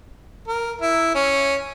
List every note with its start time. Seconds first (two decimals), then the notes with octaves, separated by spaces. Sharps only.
0.48 A#4
0.81 E4
1.15 C#4